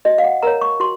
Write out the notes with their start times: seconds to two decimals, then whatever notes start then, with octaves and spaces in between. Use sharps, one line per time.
0.05 F#4 D#5
0.18 F5
0.24 F#5
0.42 A#4 C#5 A#5
0.61 C#6
0.80 F#4 C6